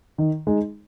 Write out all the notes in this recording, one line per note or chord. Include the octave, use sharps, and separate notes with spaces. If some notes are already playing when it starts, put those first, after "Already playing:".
D#3
G#3 D#4